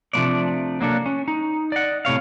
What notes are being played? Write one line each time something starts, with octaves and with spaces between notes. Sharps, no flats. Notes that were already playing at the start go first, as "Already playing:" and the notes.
C3 F3 A3 B3 D4 D5
F#3 A#3 D4 A4
C#4
D#4
D5 D#5 F#5
A2 C3 C#5 F5